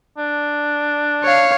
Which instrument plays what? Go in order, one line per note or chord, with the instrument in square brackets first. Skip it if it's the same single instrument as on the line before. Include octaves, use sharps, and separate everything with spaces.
[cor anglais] D4
[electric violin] C#5 F5